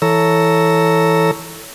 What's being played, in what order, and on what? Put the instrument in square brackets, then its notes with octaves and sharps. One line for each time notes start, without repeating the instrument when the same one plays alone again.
[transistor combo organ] E3 A4 C#5 A#5 E6